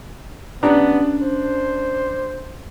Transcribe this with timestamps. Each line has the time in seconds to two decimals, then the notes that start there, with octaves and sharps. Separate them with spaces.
0.63 B3 C#4 D4 G4 A#5
1.22 C5